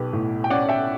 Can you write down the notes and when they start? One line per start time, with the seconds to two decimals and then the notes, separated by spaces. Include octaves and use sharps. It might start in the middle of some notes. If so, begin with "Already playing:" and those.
Already playing: B1 G4 B4
0.13 A2
0.44 G5
0.50 C#4 D5 F#5
0.69 E5 G5